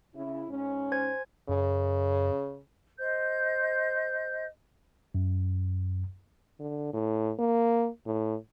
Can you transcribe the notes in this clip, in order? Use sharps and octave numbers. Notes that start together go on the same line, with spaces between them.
C#3 E4
G#2 C#4
C5 G#5 G#6
F#2 C#3
C5 D#5 G6
F#2
D3
A2
A#3
A2